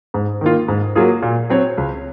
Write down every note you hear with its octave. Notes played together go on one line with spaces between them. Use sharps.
G#2
D#3 A#3 F4
G#2
F#3 A#3 F4 G#4
A#2
F#3 C4 F#4 C#5
C#2